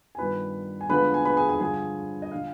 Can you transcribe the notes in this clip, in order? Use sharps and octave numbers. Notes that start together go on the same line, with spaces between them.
G#5
G2 D#3 B3 F4 B4 B5
G#5
D3 F3 G#3 B3 B4 B5
G#5
B4 B5
G#4 G#5
G#4 G#5
G2 D3 F3 G#4 G#5
D#5
D3 F3 F5